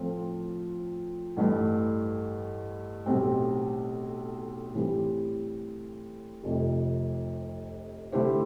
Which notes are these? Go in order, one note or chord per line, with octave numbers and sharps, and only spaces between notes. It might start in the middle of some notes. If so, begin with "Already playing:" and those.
Already playing: A2 F3 C4 F4 A4
A1 G2 E3 A3
B1 A2 G3 C4
A2 E3 G3 C4 G4
F1 F2 C3
D3 A3 E4 G4 C5